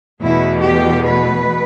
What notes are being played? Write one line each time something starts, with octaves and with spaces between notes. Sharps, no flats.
E2 B2 A3 E4
G4
B4